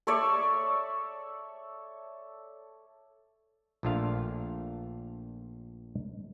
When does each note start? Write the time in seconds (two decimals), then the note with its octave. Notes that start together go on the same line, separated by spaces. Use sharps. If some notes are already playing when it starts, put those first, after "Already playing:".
0.07 A4 C#5 D5 E5
3.83 A#1 A#2 A3 D4 F4 F5